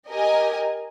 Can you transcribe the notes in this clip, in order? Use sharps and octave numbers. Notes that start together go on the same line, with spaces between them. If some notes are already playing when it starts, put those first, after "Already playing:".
G4 A#4 D#5 G#5